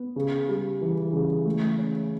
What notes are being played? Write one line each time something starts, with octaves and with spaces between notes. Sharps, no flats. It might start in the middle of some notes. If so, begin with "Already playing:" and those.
Already playing: B3
C#3
G3
E3
C#3
A3
C#4